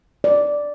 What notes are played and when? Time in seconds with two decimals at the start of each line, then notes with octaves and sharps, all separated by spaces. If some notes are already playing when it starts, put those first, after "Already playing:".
0.24 D5